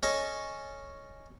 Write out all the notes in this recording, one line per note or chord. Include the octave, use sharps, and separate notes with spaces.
C#4 A4 D#5 G#5 A5